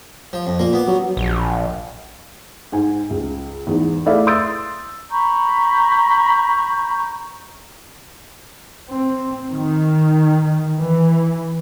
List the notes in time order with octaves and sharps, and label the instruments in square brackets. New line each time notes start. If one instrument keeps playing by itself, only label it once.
[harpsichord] F3
F2
[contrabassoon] A#2 [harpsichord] A#3
[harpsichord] B3 D6
[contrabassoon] F#3
[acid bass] A#1
[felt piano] G#2 G#5
C#2
E2 G#2
A3 E4 G#4 D5 E5 F5
C6 D#6 E6 G6 A6 D7
[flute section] A#5 B5 C#6 G6
[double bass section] C4
D#3
E3